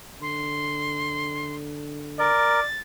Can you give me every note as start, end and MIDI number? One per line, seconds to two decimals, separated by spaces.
0.22 2.31 50
0.22 1.55 84
2.19 2.60 70
2.19 2.66 74
2.19 2.81 93